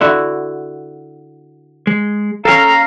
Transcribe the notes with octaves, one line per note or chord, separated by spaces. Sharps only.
D3 E4 F#4
G#3
C#4 A4 F5 G5 A5 A#5